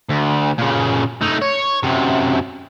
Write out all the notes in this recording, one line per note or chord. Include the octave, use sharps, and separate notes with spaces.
D2
A#2 C#3
A3 D#4
C#5
F#2 C3